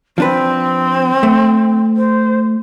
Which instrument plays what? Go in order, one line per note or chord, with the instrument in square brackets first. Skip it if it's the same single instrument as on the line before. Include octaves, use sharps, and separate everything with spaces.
[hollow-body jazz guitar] F3 D4 B4 [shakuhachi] C4
[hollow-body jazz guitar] A3
[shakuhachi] C5